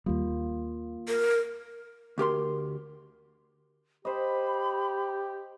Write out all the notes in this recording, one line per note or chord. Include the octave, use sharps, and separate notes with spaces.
D#2 G3 A#3 F4
A#4
D2 G4 A#4 C6
G4 C5 D#5 B5